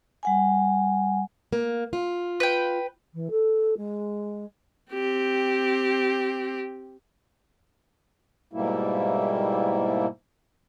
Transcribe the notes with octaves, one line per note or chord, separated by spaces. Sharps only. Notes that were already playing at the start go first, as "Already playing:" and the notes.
G3 F#5 G#5
A#3
F4
B4 G5
E3
A4
G#3
C4 G4
G#2 B2 G3 A#3 E4